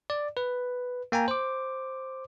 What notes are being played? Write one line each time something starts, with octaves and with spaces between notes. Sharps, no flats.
D5
B4
A#3 G5 G#5 A#5
C5 D6